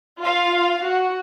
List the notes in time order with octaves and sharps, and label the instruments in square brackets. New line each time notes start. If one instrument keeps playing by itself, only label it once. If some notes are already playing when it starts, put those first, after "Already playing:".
[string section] F4 F5
F#4